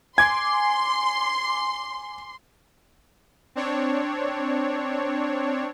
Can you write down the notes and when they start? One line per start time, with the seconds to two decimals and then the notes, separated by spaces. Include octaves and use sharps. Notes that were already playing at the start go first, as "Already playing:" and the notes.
0.18 G#5 C6 D6 G#6
3.55 C4 D4 C#5